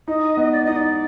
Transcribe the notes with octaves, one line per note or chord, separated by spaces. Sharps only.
D#4 D#5
B3
D5
D#4 D#5
D5